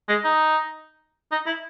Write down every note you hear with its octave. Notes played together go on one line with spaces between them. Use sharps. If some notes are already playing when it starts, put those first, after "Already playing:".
G#3
D#4
D#4
E4